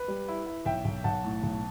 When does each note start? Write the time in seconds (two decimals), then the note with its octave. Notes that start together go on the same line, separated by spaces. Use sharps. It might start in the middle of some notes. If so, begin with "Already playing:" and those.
Already playing: B4
0.08 G3
0.28 E4
0.47 E4
0.66 B1 E5 G5
0.85 B1
1.04 B1 F#5 A5
1.24 A2
1.43 B1